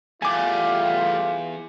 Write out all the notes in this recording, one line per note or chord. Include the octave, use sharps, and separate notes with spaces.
E2 G3 A3 F4 G#5 D6